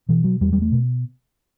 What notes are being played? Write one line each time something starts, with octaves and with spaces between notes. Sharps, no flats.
B2 E3
F#3
E2 G3
G3
A3
B2